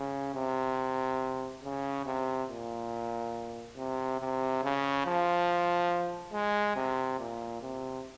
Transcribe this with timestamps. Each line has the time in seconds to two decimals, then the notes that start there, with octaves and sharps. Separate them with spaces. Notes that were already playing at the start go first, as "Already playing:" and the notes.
Already playing: C#3
0.35 C3
1.64 C#3
2.06 C3
2.49 A#2
3.77 C3
4.20 C3
4.63 C#3
5.06 F3
6.33 G#3
6.76 C3
7.19 A#2
7.61 C3